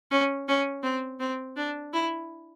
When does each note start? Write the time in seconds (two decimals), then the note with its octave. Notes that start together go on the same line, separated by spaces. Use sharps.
0.11 C#4
0.48 C#4
0.83 C4
1.20 C4
1.56 D4
1.93 E4